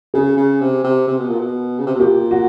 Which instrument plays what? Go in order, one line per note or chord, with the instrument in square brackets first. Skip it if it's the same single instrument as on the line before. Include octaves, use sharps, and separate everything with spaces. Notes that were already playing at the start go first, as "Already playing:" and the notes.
[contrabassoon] C#3 [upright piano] G#4
[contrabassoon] C#3
C3
C3
C3
B2
A#2
B2
C#3
C3
B2
[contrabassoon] A#2 [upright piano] G4
[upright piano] F#4